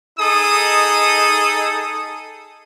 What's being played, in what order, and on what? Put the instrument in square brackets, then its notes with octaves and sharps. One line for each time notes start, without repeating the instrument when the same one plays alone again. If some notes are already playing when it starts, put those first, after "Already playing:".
[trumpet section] D#4 G#4 A4 D#6